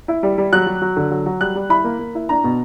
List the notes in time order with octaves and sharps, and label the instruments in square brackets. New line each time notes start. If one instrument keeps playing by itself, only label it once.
[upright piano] E4
G3
G3
F#3 F#6
F#3
F#3
D3
F#3
F#3
G3 F#6
G3
E4 B5
A#3
A#3
E4
D4 A#5
B2